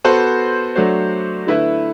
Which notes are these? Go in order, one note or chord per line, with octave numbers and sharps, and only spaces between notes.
B3 F#4 A4 C5
F#3 A3 D4 F#4 C5
D3 A3 E4 B4 E5